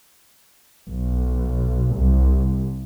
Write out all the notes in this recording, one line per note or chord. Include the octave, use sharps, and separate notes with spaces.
B1
C2